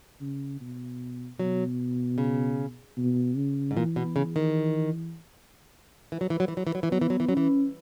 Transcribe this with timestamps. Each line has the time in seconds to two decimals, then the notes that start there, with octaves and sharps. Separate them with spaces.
0.21 C#3
0.61 B2
1.39 B2 F#3
2.18 C#3
2.97 B2
3.36 C#3
3.71 G#2
3.76 A#2 E3
3.96 B2
4.16 C#3
4.36 D#3
6.12 E3
6.21 F#3
6.30 E3
6.40 F#3
6.48 E3
6.57 F#3
6.67 E3
6.75 F#3
6.83 E3
6.92 F#3 B3
7.01 E3
7.10 F#3
7.20 E3
7.29 F#3 C#4
7.37 E3